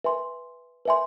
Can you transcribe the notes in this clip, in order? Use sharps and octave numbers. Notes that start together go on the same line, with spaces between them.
B4 E5 G#5 C6
B4 E5 G#5 C6